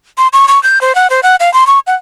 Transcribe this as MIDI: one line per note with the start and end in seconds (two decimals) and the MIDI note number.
0.18 0.28 84
0.33 0.46 85
0.48 0.61 85
0.63 0.81 91
0.81 0.95 72
0.95 1.10 78
1.10 1.20 72
1.23 1.36 78
1.40 1.52 77
1.54 1.66 84
1.67 1.79 85
1.87 1.95 78